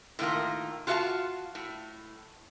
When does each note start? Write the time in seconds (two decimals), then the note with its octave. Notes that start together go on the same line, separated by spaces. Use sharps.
0.19 A2 D#3 A#3 F4
0.87 F4 F#4 A4 E5 F5 A5
1.55 A2